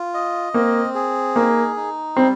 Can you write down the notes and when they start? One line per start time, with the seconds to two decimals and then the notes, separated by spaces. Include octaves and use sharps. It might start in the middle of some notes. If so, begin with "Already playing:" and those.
Already playing: F4
0.14 D#5
0.54 A#3 C4
0.95 G#4
1.35 A#3 D#4
1.76 D#4
2.16 G3 C4